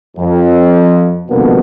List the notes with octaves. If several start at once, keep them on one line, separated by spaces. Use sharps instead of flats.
F2
C2 F2 B2 D3 A#3 B3